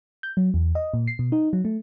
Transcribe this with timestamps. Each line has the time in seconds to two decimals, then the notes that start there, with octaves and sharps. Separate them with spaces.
0.23 G6
0.37 F#3
0.54 E2
0.75 D#5
0.94 A#2
1.08 C7
1.19 B2
1.32 D#4
1.53 F#3
1.65 A3